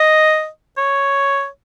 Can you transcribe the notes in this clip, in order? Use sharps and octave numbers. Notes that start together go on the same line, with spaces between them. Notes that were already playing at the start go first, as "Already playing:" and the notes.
Already playing: D#5
C#5